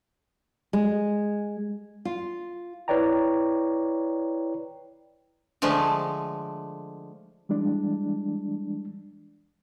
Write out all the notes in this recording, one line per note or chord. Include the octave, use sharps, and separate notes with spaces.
G#3
F4
E4 B4 C#5 D5 G5 A#5
D3 F3 G#3 A3
E3 G3 G#3 D4